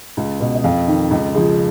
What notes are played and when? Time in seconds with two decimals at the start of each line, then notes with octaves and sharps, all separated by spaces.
0.17 C#2
0.40 B2
0.55 D#5
0.64 F2 F5
0.87 D#3
1.11 C#2
1.35 C#3 F3